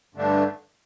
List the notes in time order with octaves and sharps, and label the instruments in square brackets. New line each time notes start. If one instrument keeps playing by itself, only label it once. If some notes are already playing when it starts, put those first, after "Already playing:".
[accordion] G2 D3 A3 D4